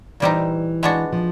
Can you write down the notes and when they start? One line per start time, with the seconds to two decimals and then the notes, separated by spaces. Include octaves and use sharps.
0.20 A#2 E3 G3 C4 D#4 G4
0.83 G#3 B3 D4 F#4
1.12 F3